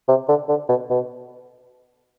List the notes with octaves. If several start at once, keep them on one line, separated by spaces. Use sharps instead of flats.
C3
D3
D3
B2
B2